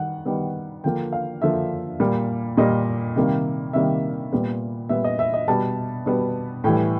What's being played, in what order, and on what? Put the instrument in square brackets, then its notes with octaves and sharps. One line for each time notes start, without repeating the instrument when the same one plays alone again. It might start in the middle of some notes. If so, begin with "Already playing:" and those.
Already playing: [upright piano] D#3 G3 F#5
D#3 G3 B3
D3 F3 A#3 G5
F5
D3 F3 A#3 E5
A#2 G3 A#3
A#2 G3 A#3 D#5
C3 D#3 G3 A#3
C3 D#3 G3 A#3 E5
A#2 G3 B3
A#2 G3 B3 E5
D#5
E5
D#5
B2 G3 B3 A5
B2 G3 B3
A2 E3 G3 G5